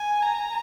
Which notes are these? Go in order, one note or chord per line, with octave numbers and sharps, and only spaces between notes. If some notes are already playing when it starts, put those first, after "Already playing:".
Already playing: G#5
A#5